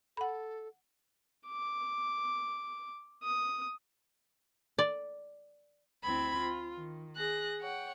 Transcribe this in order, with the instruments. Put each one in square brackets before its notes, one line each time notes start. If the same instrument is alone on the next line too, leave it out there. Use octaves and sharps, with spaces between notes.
[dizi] A4 [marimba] F#5 B5
[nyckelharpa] D6
D#6
[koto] D5
[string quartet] D2 C4 E4 B5 G#6
F4
D#3
G#4 F#6 A#6
C#5 F#5 G5